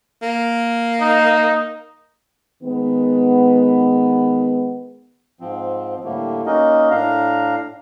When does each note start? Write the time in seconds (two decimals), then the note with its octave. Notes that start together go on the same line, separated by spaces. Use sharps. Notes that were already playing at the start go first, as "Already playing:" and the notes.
0.22 A#3
1.01 D#4
2.63 D#3 G#3 B3
5.41 G#2 F3 C4
6.04 A2 D3 G3 A3 A#3
6.46 A#3 C#4 D#4 F#4 A#4 D#5
6.91 A2 D4 F5 A#5